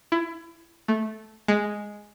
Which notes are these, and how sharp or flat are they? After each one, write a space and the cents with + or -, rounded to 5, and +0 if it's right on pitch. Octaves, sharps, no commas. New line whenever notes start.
E4 +25
A3 -10
G#3 +0